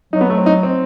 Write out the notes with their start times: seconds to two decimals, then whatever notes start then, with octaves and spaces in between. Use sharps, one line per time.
0.13 F#3 D#4
0.21 B3
0.30 A3
0.38 C4
0.46 D#4
0.63 C4